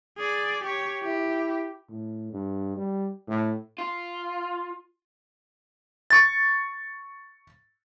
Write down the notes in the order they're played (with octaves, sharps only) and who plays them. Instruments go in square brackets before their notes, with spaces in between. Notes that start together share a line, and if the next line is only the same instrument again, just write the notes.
[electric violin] G#4 D5
G4 C#5
[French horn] E4 [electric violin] G4
[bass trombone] A2
G2
G3
A2
[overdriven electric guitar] F4
[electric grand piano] C#6 A6